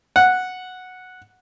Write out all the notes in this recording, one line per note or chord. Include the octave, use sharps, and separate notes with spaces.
F#5